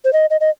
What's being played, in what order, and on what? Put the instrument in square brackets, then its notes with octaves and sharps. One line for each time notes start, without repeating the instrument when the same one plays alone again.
[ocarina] C5
D#5
D#5
D#5